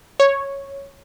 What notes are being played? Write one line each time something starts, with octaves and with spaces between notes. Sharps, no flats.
C#5